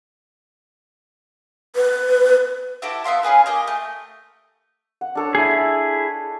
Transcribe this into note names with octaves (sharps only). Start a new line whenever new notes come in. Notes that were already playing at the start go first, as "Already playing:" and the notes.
B4
E4 F#4 G4 A4
B3 E5 F5 C6
C#4 F4 G#4 B4
A#3 G4 D#5
A3
F#5
D4 A4 C#5
E4 G#4